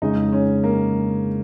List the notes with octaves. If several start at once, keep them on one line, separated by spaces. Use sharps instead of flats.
F2 C#3 G#3 D#4
C#4
A#3